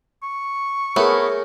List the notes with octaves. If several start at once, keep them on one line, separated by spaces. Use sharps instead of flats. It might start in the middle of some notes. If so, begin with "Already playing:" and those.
C#6
A3 B3 E4 G#4 A#4 C#5